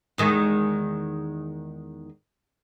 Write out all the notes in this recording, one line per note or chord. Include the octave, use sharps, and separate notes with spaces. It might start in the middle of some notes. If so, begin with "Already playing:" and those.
E2 D#3 G#3